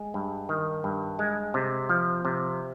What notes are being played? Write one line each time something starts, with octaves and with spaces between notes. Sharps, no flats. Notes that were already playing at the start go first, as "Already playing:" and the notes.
Already playing: G#3
G2
D#3
G2
G#3
C3
F3
C3